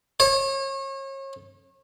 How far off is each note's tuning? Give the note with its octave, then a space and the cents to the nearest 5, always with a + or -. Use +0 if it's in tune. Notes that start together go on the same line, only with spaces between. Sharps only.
C#5 -35